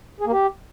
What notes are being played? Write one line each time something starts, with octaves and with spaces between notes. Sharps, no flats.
G#4
A#3
G4